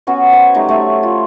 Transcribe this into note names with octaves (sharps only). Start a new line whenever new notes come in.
B3 C#4 F#4 F#5
C5 C#5
F#3 G3 A3 D#4
A3 E5
F4